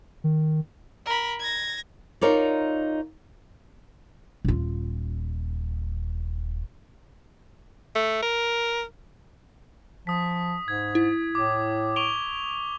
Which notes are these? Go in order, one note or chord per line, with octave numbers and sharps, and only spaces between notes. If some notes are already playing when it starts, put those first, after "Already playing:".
D#3
A#4 B5
G#6 A#6
D#4 F4 A#4 C#5 D5
D#1 F4
A3
A#4
F3 D#6 B6
G#2 G#6
E4
A2 D6
C#6 D7 F7 G7